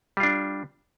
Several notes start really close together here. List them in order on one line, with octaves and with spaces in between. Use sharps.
G3 F4 D4